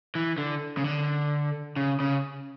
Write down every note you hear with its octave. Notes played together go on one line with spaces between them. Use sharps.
E3
D3
C#3
D3
C#3
C#3